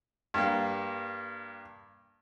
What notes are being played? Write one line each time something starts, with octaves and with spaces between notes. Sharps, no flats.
G2 A#3